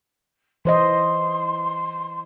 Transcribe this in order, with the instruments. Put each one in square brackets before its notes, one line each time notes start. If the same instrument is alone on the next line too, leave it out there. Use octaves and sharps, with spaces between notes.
[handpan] E3 C5 D#5 [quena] C6